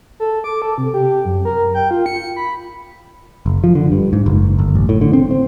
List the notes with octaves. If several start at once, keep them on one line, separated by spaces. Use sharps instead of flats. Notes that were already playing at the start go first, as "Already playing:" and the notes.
A4
D6
A4
C3
G4
F#2
A#4
G5
F4
C#7
B5
F#1
F3
D3
G2
G#2
F#1
G1
A1
A2
D3
C4
C4